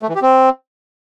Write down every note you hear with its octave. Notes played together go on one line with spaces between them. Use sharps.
A3
E3
G4
C4